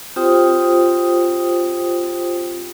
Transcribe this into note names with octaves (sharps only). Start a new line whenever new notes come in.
C4 F4 G4 C5 G5 D#6